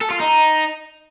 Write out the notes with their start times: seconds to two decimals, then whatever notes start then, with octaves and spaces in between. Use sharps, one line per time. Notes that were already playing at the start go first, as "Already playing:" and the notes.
0.01 A4
0.10 F4
0.20 D#4